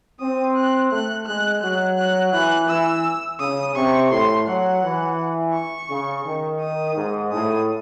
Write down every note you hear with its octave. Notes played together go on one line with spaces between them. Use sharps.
C4 D#6
F#6
A3 F#6
G#3 F#6
F#3 F#6
F#6
E3 F#6
E3 E6
C#3 D#6
C3 C#6
A2 C6
F#3 F#5
E3
C#6
C#3
D#3
D#6
G#2
A2 D#6